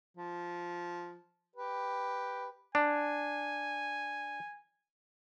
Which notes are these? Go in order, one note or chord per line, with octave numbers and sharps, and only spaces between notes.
F3
G4 B4
D4 G#5